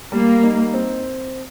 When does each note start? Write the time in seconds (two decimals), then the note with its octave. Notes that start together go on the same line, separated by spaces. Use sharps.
0.12 G3 A#3
0.43 D#4
0.74 C4